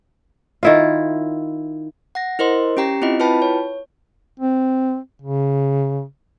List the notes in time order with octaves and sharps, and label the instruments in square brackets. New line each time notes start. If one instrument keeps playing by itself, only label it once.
[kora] D#3 E4 F4
[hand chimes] F#5 A#6
E4 A#4 C5 D#5 C6
C#4 G4 G5 A#5 C7
C4 E4 F4 D#5
E4 F4 B4 G5 A5 B5
C#5
[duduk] C4
C#3